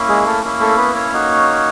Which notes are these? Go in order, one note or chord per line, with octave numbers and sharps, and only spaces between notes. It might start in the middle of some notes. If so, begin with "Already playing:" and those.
Already playing: A#3 C#4 E4
G#3 G#4
A3 A4
A#3 C#4 E4
A3 A4
B3 B4
C#4 C#5
A#3 D#4 F#4